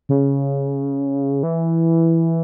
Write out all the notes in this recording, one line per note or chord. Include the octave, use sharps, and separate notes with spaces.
C#3
E3